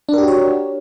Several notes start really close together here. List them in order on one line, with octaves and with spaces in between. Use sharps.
D4 A#4 G4 F#4 C#5